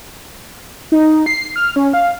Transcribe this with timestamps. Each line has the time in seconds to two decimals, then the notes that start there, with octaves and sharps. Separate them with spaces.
0.92 D#4
1.26 C7
1.56 F6
1.76 C#4
1.93 F5